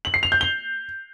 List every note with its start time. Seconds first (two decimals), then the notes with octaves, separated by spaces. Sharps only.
0.05 F#7
0.14 C7
0.23 F7
0.32 G6
0.41 G7